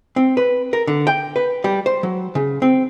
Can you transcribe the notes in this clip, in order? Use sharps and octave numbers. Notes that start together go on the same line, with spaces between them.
C4
B4
A#4
D3
G5
B4
G3
C5
F#3
C#3
C4